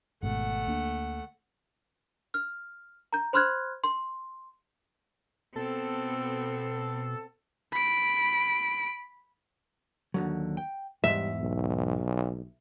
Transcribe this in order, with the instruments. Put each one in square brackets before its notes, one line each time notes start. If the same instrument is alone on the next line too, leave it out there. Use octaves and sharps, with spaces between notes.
[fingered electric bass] G#1 G#2 B2 [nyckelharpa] A3 F#5
[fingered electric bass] D2 A#3 D4
[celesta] F6
A#5 G6
C5 B5 C6 F6 F#6 G#6
C6
[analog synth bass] B2 [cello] B3 C4 [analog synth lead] A4
[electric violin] B5 D7
[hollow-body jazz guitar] D#2 D3 F#3
G5
[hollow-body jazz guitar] E2 G#2 [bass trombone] G3 [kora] E5
[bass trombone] B1